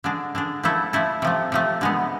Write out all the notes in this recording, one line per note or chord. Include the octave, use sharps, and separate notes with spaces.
D3 G#3 D4
D3 G#3 D4
F3 A3 E4 A4
F3 A3 E4 A4
C3 F3 A3
C3 F3 A3
D3 G#3 B3